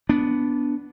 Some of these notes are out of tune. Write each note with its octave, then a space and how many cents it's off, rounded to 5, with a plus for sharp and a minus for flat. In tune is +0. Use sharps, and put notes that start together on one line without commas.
B3 +0 D4 -10